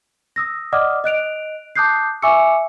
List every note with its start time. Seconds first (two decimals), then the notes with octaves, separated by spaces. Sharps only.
0.36 D#6 E6 A#6
0.72 D5 D#5 F#5 D6 D#6 F6
1.04 D#5 F#6 D7 F7
1.76 A5 D6 D#6 F#6 G6 C7
2.22 E5 G#5 C#6 D6 E6 C#7